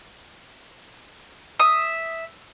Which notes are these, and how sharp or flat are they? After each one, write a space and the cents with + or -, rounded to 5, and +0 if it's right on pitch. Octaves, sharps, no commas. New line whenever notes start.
E5 -5 D#6 +0